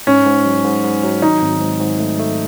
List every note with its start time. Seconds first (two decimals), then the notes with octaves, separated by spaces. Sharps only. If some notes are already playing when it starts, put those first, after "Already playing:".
0.07 G#2 C#4
0.26 G#2
0.46 F#3
0.65 G#2
0.84 G#2
1.03 F#3
1.22 G#1 D#4
1.41 G#1
1.61 G#2
1.80 G#2
1.99 A3
2.19 A3